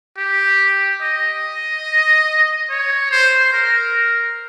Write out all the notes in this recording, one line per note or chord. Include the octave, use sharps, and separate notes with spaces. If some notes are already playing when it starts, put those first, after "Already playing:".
G4
D#5
C#5
C5
A#4